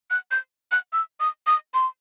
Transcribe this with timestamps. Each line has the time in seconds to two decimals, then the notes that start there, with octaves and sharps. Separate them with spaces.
0.11 F#6
0.31 G6
0.72 F#6
0.93 E6
1.20 D#6
1.47 D#6
1.74 C6